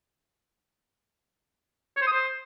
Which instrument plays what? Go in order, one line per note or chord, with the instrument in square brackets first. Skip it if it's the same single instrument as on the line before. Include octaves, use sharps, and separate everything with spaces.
[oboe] C#5
C5
D#6
C5